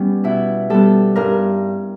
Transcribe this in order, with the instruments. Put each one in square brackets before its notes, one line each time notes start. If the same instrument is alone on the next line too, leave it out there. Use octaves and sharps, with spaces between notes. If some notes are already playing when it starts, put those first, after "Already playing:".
Already playing: [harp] G3 B3 C#4
B2 E4
G3 B3 A4
G2 A#4